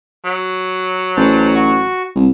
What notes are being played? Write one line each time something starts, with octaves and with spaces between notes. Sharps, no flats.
F#3
A1 C5 A5
F#4 C#6
C2